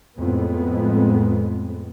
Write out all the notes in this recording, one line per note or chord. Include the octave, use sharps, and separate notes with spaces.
F2 A2 G#3 B3